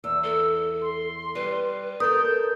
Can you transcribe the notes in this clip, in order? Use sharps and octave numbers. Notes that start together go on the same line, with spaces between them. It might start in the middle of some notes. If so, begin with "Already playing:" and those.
E2 E6
A4
C6
G3 B4
A4 A#4 D#6 G6